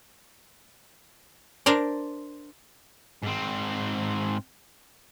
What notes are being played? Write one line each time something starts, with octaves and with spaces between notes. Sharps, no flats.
D4 A#4 C5 D5
G#2 C4